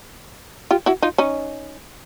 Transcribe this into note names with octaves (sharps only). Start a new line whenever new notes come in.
F4 G4
E4 F#4
D#4 F4
C#4 D#4